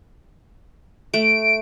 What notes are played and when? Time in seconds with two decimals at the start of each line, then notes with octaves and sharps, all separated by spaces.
1.14 A3 D7